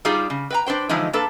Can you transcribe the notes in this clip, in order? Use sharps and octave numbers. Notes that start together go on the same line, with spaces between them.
G3 D#4 F4 G4 G#4
C#3
B4 G5 A#5
D4 B4 C5 G5
D3 E3 F3 G#3 D#4
A#3 D4 A4 B4